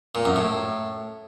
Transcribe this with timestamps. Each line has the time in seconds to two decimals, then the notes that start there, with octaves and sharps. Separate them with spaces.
0.15 A#2
0.25 F#2
0.36 A2